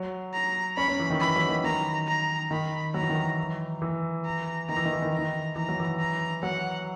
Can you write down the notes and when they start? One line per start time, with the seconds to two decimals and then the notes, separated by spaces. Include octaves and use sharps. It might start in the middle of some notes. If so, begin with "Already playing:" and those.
Already playing: F#3
0.33 A#5
0.77 C#4 B5
0.88 C#4
1.00 E3
1.10 D#3
1.20 E3 B5
1.36 F#3
1.49 D#3
1.64 D#3 A#5
2.07 A#5
2.51 D#3 B5
2.94 F#3 A#5
3.02 E3
3.10 D#3
3.17 E3
3.82 E3
4.25 A#5
4.69 D#3 A#5
4.76 E3
4.86 D#3
4.93 E3
5.02 D#3
5.10 E3 A#5
5.19 D#3
5.56 E3 A#5
5.69 F#3
5.80 E3
6.00 A#5
6.43 F#3 F#5